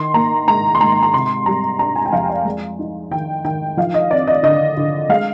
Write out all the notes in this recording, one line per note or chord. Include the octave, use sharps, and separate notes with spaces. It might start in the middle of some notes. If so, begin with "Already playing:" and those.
Already playing: D#3 C6
A#3 A#5
G#2 A#5
C6
G#2 A#5
A#5
C3 C6
G3 A#5
D4 A#5
G#5
G5
F2 F5
D5
G#3
D#4
D#3 G5
D#3 G5
F3 F5
D#5
C4 D5
D#5
D3 D#5
D3
G#3 F5